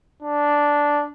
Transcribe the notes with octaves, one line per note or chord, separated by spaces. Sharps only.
D4